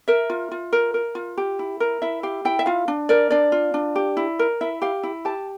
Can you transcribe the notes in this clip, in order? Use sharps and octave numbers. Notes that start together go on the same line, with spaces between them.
A#4 E5
F4
F4
A#4
A#4
F4
G4
E4
A#4
E4 E5
G4 F5
E4 G5
E5
F4 F5
D4
A#4 D5
D4 D5
F4
D4
G4
E4
A#4
E4 E5
G4 F5
E4
G4 A5